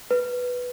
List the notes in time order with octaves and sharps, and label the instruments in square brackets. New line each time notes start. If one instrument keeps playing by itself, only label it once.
[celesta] B4